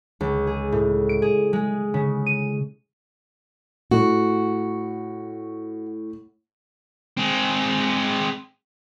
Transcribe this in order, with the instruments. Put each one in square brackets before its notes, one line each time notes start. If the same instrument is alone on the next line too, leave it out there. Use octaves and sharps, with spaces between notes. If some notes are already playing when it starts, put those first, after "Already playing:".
[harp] C#2
G#4
A2
D7
G#4
G#3
C#3
D#7
[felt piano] A2 [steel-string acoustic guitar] F#4
[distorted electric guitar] G#3 C4